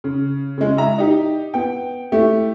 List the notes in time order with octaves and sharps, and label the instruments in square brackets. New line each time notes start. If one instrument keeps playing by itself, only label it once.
[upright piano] C#3
C#3 G#3
E5 A#5
D#4 G4
B3 G5
A3 E4 G4